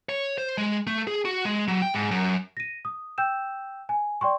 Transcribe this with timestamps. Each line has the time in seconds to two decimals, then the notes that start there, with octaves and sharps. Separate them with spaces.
0.09 C#5
0.38 C5
0.58 G#3
0.87 A3
1.07 G#4
1.25 F#4
1.45 G#3
1.68 F#3
1.82 G5
1.94 G#2
2.11 F#2
2.57 A#6 D#7
2.85 D#6
3.18 G5 E6 G6 E7
3.89 G#5
4.21 D5 G5 C6 C#6